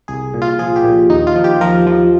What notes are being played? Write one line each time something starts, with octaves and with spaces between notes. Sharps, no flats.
C2 G#4
A#2
F4
F3 G#4
G4
A#2
D#2 D#4
F4
F3
G4
F3 A#4
F3